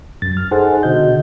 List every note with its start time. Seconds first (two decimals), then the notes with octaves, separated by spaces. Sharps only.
0.22 F#2 A6
0.37 F6
0.51 D#4 G#4 A4 C5 F#5
0.83 B2 D3 F#4 D#5 G6